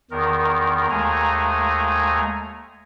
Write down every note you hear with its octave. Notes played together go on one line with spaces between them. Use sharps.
E2 D#3 A#4
D#2 G#3 A3 G#5 A#5